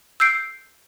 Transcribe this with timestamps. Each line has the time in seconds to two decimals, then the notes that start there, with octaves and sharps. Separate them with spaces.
0.20 E6 G6 C7 D7